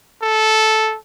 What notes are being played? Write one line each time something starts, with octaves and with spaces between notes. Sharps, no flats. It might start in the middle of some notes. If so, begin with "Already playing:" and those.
A4